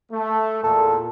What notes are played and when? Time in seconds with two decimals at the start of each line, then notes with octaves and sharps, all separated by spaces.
0.12 A3
0.64 E2 A#2 A4